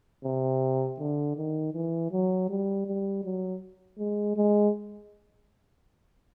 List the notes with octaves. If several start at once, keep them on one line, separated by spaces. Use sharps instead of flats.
C3
D3
D#3
E3
F#3
G3
G3
F#3
G#3
G#3